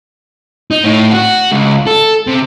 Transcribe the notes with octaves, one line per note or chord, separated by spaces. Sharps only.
D#4
A2
F#4
C#2
A4
C3